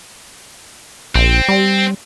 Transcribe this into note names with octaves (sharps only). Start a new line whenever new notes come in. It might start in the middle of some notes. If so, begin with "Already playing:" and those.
A#1 C4
G3